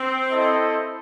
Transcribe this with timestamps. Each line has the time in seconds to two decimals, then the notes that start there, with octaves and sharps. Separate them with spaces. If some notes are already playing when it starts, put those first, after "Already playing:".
Already playing: C4
0.31 E4 A4 C5 D#5